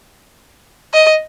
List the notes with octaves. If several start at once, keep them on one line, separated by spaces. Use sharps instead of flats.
D#5